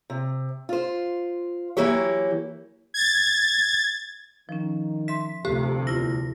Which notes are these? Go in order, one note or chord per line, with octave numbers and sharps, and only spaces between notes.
C3
F4 C5
E3 F#3 A#3 E4 G4 C#5
G#6 A6
D#3 F3 C#4
E5 C6 B6
D2 C3 A#3 F4 G4 A4
E2 E4 F4 A#6